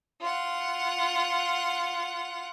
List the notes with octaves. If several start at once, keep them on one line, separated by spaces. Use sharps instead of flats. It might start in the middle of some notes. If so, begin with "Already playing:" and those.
F4 F#5